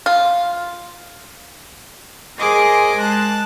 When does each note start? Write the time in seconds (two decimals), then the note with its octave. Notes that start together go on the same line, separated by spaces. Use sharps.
0.06 F4
2.39 G#4 A#4 C5 D#5 G#5 D6
2.98 G#3 A5 F#6